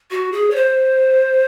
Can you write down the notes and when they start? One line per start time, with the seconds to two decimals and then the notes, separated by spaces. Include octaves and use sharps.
0.11 F#4
0.32 G#4
0.50 C#5
0.56 C5